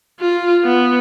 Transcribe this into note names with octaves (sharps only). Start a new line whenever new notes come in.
F4
B3